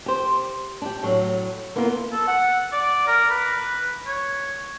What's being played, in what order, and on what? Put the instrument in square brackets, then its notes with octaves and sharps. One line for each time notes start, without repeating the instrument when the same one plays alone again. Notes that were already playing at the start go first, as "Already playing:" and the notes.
[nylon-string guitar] G4 C5
D4 G4
A2 F#3
A#3 B3 E4 F4 A#4
[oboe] A4
F#5
D5
A#4
B4
C#5